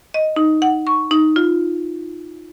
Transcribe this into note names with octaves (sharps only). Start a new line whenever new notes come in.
D#5
D#4
F#5
C#6
D#4
F4